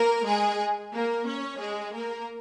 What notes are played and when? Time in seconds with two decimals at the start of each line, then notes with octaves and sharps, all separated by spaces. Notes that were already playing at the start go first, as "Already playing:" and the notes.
Already playing: A#3 A#4
0.26 G#3 G#4
0.93 A#3 A#4
1.26 C#4 C#5
1.59 G#3 G#4
1.93 A#3 A#4